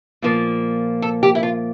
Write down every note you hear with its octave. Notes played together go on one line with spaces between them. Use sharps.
A#2 F3 A#3
A4
G4
E4
F4